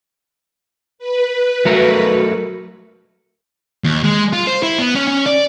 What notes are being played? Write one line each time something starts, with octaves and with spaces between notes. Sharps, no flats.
B4
F#3 A3 F#4 A#4
D#2
G#3
F4
C5
E4
B3
C#4
C#4
D5